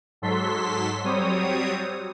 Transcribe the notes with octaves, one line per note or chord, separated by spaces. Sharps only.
G#2 F#3 A4 C6 B6
F#3 G3 C4 C#5 D#6